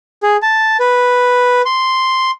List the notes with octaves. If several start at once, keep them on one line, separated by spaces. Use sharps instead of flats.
G#4
A5
B4
C6